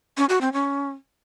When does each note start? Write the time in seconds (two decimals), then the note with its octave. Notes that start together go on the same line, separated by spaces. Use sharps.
0.18 C#4
0.29 F#4
0.41 C4
0.53 C#4